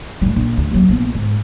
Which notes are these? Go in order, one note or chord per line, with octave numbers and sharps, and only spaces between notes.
A2 G3
A#1
D2
D#2 F#3
A#1 B3
G#2